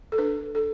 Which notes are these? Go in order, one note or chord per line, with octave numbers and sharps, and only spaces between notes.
A4
D4 B4
A4